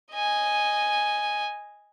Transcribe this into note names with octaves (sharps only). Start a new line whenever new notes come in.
D#5 G#5